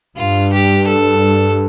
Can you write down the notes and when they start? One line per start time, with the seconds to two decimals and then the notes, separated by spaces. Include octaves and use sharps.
0.17 G2 F4
0.53 G4
0.87 A4